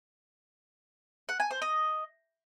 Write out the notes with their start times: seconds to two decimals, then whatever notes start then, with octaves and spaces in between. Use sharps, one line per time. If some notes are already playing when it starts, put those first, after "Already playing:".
1.29 F#5
1.40 G#5
1.51 C5
1.62 D#5